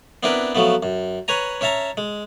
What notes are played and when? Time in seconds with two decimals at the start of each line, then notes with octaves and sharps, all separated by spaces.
0.23 B3 C4 D4 E4 A#4 B4
0.55 F3 F#3 A3 B3
0.83 F#2
1.28 B4 C#5 G#5 A#5
1.61 C#4 C#5 E5 A5 A#5
1.97 G#3